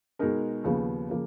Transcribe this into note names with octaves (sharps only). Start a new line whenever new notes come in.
B2 G#3 D#4 A#4
D#2 C#3 F3 B3
C#3 F3 A#3